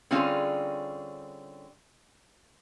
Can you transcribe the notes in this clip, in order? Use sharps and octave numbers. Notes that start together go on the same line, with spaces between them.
D3 G3 C4 C#4 F4 G#4